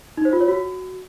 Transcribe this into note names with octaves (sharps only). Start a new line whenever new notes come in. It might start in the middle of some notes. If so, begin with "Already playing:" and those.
D#4
C5
F4
C#5
F#4